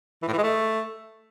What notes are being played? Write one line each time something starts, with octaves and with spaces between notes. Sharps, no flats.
E3
A2
E3
G#3
A3